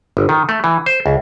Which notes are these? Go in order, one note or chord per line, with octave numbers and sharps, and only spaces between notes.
G1
D#3
A3
E3
C5
C#2